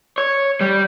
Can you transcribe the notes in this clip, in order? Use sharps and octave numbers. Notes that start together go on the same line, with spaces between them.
C#5
G3